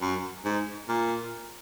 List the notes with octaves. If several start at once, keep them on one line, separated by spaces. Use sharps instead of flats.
F#2
G#2
A#2